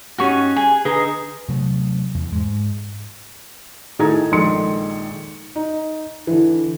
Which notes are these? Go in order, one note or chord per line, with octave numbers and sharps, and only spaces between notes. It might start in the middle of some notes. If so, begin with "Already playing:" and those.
G2 C#4 D#4 F#4 G4 C#6 F#6
G#4 G#5
D3 D#4 G#4 B4 D#5 A#5
C3 F#3 A3
E2
G#2 G#3
A2 D#3 G#4 A4 A#5 G#6
A#1 D#3 G#3 A4 C6 C#7
D#4
D3 E3